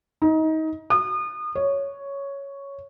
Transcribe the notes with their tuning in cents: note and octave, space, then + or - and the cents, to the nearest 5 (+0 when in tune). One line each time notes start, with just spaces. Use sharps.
D#4 +25
D#6 -35
C#5 +5